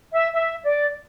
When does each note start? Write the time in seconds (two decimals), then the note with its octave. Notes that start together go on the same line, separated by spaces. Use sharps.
0.13 E5
0.34 E5
0.65 D5